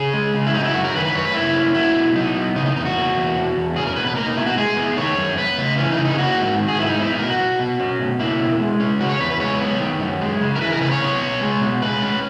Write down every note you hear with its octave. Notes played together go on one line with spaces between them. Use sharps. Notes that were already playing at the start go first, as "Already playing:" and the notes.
Already playing: C#3 G#4
G#3
C#3
E4
F#3 D#4
E4
F#2 F#4
A#4
D#3 B4
B4
F#2 C#5
B4
A#3 E4
C#4
F#3 E4
B2
F#3 D#4
B3
C#3 D#4
D#4
E2 D#4
F#4
A#3
E2
B2
E2
C#4 G#4
A#4
B2 B4
B4
A#3 A#4
D#4
B2 E4
F#4
G#3 G#4
B3
D#3 C#5
F#2
B3 B4
C#3
E3 C#4
D#4
C#3
D#4
G#4
A#3 F#4
G#2
D#3
G#4
G#2 E4
D#4
B3 E4
D#4
B2 A#4
F#4
F#3
B2
C#4
B2
A#3 E4
B2
G#3
C#4
C#3 F#4
C#5
E2 B4
B4
G#3 C#5
B3
D#3
F#2
G#3
C#3
A#4
E3 B4
A#4
C#3 B4
C#5
B3
B2
G#3
B2
G#3 B4
C#4